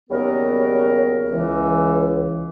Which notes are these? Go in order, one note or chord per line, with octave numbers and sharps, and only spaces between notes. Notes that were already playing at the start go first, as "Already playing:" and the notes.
D#2 C#3 F#3 G3 B3 A#4
C#2 E3